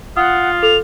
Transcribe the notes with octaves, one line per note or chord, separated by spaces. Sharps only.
F4 F#5 D#6
A4 F7